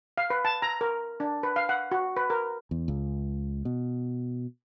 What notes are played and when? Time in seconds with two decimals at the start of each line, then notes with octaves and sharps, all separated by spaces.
0.18 F5
0.30 B4
0.45 A5
0.62 A#5
0.81 A#4
1.20 D4
1.43 B4
1.56 F5
1.69 F#5
1.92 F#4
2.17 B4
2.30 A#4
2.71 E2
2.88 C#2
3.65 B2